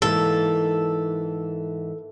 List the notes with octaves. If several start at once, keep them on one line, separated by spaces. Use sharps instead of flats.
G#2 E3 A#3 A4